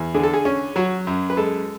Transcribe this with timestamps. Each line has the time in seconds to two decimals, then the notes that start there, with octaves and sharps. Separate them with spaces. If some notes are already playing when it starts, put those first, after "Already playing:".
Already playing: E2
0.14 D3 G#4
0.23 A4
0.34 G#4
0.45 C#4
0.76 F#3 F#4
1.07 F#2
1.30 B4
1.37 G#3 A4